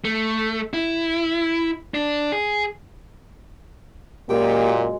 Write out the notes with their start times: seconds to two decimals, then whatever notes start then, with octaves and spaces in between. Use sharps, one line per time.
0.05 A3
0.73 E4
1.94 D4
2.32 G#4
4.30 F#2 A#2 G#3 A#3 G4 F#5